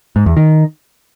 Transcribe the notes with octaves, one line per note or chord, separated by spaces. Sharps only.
G#2
E2
D#3